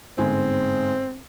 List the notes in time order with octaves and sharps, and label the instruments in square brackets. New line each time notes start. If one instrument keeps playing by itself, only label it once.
[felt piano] G1 G#2 G#5 [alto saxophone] C4